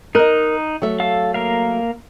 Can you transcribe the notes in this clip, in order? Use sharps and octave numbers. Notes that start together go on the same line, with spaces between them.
D#4 A#4 D#5 F#6
F#3 A3 E5
A4 F5
A#3 A#4 F5